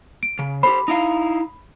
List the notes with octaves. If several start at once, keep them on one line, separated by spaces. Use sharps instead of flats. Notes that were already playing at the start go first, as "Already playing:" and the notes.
D7
C#3
G4 A4 C5 B5
D#4 E4 F5